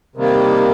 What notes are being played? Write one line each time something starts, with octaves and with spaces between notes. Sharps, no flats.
C3 D#3 G3 A#3